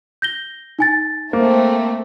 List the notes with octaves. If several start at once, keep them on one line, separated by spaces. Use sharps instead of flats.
G6 A#6 G7
D#4 G#5 A6
A3 A#3 C4